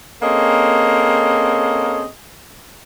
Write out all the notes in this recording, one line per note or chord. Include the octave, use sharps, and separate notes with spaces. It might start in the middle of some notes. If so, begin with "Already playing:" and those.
A#3 C4 C#4 G#4 A4 D#5